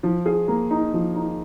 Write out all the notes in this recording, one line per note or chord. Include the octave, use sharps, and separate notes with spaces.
F3
G#4
A#3
D#4
F3
D#4